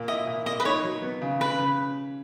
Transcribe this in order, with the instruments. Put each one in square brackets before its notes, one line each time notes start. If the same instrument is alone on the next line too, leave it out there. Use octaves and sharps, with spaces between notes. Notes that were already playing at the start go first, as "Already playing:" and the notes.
Already playing: [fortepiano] A#2
[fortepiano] E4 [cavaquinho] D#5
[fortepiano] A#2
[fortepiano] A#2 [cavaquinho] D#5
[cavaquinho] B4
[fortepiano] D#4 [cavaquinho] C#5
[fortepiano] F#3
B3
C#3
[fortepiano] C#3 [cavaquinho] B4
[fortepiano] C#3